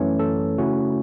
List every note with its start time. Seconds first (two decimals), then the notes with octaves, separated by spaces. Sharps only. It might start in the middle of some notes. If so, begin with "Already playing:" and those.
Already playing: F#2 E3 A3 C#4 C#5
0.19 A4
0.58 C#3 A3 C#4 E4 F#4